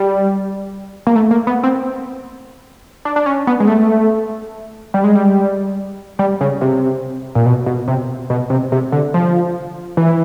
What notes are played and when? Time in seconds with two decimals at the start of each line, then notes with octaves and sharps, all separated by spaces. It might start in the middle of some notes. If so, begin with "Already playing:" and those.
Already playing: G3
1.07 A#3
1.16 A3
1.31 A#3
1.47 B3
1.63 C4
3.05 D4
3.16 D4
3.26 C#4
3.47 B3
3.60 G#3
3.67 A3
4.94 G3
5.04 G#3
5.15 G3
6.19 G3
6.41 C#3
6.61 C3
7.35 A#2
7.46 B2
7.66 B2
7.88 C3
8.30 B2
8.50 C3
8.72 C3
8.92 D3
9.14 F3
9.97 E3